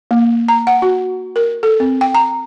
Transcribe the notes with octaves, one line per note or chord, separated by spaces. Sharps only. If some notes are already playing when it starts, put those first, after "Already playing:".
A#3
A#5
F#5
F#4
A#4
A4
C4
G5
A#5